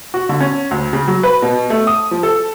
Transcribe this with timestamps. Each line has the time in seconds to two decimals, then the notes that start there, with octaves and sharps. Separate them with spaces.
0.14 F#4
0.29 D3
0.40 C#4
0.71 D2
0.93 C#3
1.08 F#3
1.23 B4
1.42 B2
1.70 A3
1.87 D#6
2.11 F3
2.23 A4